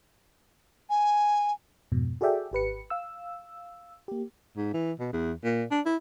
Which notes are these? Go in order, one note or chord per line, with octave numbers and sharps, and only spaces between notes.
G#5
F2 G#2 B2
F#4 G#4 A4 D5 E5 G5
G#1 G4 B4 C#7
F5 E6
A#3 G4
G#2
E3
B2
E2
A#2
D4
E4